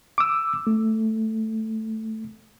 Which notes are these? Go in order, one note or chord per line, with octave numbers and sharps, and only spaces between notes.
D6 E6
A3